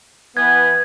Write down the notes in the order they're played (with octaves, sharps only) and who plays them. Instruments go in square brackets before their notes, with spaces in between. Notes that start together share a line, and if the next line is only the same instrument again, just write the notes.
[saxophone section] E3 B3 [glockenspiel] G#6